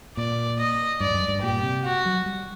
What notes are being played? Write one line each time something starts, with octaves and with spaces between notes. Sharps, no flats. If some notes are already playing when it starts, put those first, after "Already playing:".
A#2 D5
D#5
G2 D5
G2
F#2
G2
A#2 G4
C3
F#4
F#3
G3